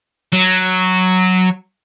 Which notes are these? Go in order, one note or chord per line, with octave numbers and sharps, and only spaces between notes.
F#3